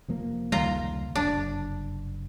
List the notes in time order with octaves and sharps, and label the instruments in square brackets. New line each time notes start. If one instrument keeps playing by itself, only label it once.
[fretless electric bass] F1 F3 A#3
[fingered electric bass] C#2 D#3 G3 [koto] F4 A#5
[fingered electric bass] F#1 [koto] D4